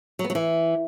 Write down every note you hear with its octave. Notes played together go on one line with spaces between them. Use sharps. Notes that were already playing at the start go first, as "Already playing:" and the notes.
F#3
B3
F#3
E3